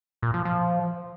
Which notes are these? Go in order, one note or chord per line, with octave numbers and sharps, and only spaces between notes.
A#2
F3
F3